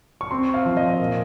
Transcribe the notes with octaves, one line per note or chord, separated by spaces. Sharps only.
C#6
C4 C6
F5
F3
D#5
A#2